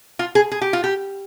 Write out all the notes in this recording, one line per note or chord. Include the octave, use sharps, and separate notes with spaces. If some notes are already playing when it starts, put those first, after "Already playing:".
F4
G#4
G#4
G4
F4
G4